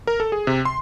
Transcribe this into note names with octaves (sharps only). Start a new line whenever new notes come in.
A#4
A4
G#4
C3
C6